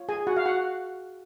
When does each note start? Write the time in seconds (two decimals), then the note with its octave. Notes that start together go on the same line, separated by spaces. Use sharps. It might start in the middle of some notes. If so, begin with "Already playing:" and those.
Already playing: F4 C#5
0.09 G#4 G#5
0.27 F#4 F#5
0.37 F5
0.46 F#4 F#5